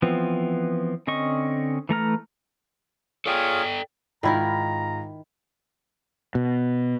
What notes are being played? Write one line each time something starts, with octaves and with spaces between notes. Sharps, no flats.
E3 F3 B3 C4
D3 C4 C#4 D#5 C#6
E3 A3 A#5 F6
F4 G#4 A4 C#5 D5 G5
G#2 D#3 E4 F4 A#4 A#5 B5
B2